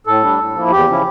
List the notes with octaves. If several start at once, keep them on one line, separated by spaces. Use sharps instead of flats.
A2 A4
G3 D4
A2
F3 A#3 E4
E2 G4
C#3 F3 C#4 E4